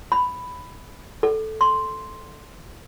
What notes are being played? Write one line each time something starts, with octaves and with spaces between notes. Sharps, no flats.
B5
A4
C6